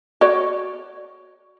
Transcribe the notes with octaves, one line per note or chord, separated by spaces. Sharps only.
F#4 C#5 D5